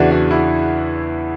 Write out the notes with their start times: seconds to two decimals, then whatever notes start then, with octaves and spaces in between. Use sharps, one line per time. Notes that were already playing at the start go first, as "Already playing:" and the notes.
Already playing: E2 C#3 E3 D4 F#4
0.11 D4 F#4
0.31 E4